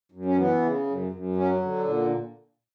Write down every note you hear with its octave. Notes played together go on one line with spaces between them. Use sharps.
F#2
C#4
E3 B3
C#3
F#2
F#2
F#3 C#4
D3
A#2 D4